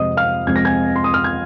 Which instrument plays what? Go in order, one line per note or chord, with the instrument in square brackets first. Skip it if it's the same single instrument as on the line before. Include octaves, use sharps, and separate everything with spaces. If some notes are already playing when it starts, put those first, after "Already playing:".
Already playing: [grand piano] F2 C3 G#3 C4 D#5 D#6
F5 F6
F2 C3 G#3 C4 G#6
A#6
G#5 G#6
C6
D#6
F6
G#6